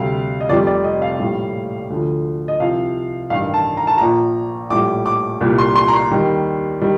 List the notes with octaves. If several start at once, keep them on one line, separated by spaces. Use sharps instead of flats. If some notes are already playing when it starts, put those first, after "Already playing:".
Already playing: D2 C3 G3 F5
D#5
F1 F2 C3 G3 D5
D5
D#5
F5
A#1 A2 G3
D2 D3 F3
D#5
C2 C3 F3 F5
A1 G2 D#3 F5
A5
A#5
A5
A#1 A#2 F3 A#5
A#1 A2 G3 D6
D6
C2 A#2 G3
C6
C6
A#5
C6
D#2 D#3 G3
D#3 G3